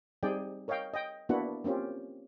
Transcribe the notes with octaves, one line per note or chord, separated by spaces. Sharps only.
G3 C4 D#4 G#4 D5 G5
A#4 C#5 D#5 F5 G5
D#5 G5
A#3 B3 D4 E4 F#4 F#5
A#3 C4 C#4 F4 G4